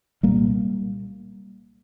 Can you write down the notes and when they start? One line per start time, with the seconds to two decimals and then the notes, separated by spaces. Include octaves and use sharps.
0.23 C2 A#2 G3 A#3